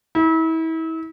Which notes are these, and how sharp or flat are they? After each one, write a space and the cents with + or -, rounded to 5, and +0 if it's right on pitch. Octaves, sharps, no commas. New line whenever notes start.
E4 -35